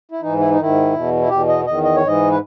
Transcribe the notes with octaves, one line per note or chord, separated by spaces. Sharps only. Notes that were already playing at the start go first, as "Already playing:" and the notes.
E4
G#2 E3 D#4
E4
D#4
G#2 D#3 E4
E2 B2
E4
E2 B2 G4
D#5
E2 D#3 D#5
D#5
C#5
G#2 E3 D#5
B4